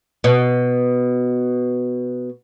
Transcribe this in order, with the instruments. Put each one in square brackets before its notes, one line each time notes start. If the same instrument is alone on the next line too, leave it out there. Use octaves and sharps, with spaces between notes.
[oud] B2